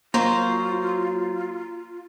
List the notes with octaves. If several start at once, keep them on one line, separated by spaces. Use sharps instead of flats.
F#3 A#3 F4 C5 A#5